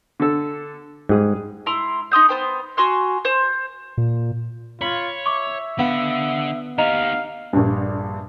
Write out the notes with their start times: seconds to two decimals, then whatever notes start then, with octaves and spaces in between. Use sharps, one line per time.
0.20 D3 A4
1.09 G#2 G3 G#4 D#6
1.66 E4 A#5 C6
2.11 D#4 C6 D#6 G6
2.29 B3 C5 G5
2.77 F#4 G#5 C6 F6
3.25 C5
3.98 A#2
4.81 F4 C#5 B5
5.26 E5 C#6 D6
5.79 D3 B3 F5 F#5
6.78 D#4 G4 D#5 F5 A#5 F7
7.53 A#1 G2